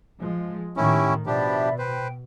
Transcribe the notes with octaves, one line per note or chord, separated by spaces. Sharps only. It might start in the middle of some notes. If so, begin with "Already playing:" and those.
F3 G#3
A2 D#3 C#4 E4 G4 G5 C#6
B2 F3 D4 G4 D5 E5 B5
B4 C5 G5